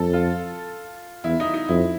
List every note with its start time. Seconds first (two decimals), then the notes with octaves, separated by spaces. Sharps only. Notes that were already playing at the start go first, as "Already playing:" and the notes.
Already playing: F2 A4
0.13 F4
1.24 E2 E4
1.40 D#4
1.54 D#4
1.68 F2 E4